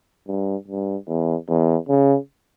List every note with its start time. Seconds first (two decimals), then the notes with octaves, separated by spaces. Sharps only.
0.28 G2
0.68 G2
1.08 E2
1.48 E2
1.89 C#3